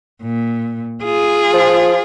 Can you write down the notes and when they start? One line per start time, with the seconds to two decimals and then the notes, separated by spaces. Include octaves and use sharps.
0.23 A#2
1.04 F4 G#4
1.54 F3